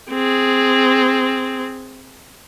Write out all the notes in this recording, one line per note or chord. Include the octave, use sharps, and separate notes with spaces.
C4 G#4